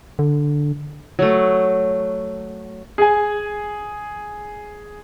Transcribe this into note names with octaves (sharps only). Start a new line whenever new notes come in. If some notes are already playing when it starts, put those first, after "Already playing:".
D3
F#3 A3
G#4 G#5